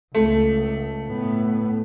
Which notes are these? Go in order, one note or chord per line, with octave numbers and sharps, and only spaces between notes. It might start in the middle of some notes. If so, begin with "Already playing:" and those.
C#2 A3
A2 B3